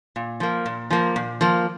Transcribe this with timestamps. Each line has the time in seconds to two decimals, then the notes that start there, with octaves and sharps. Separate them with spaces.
0.16 A#2
0.40 F3 A#3
0.66 A#2
0.90 F3 A#3
1.16 A#2
1.41 F3 A#3